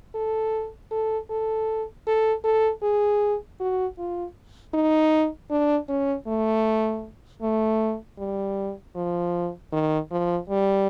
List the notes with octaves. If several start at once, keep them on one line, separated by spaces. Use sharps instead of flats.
A4
A4
A4
A4
A4
G#4
F#4
F4
D#4
D4
C#4
A3
A3
G3
F3
D#3
F3
G3